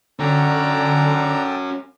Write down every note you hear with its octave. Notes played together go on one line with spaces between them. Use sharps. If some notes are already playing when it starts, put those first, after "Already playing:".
D3 C#4 D4 F#4 A4 G5 A5 A#5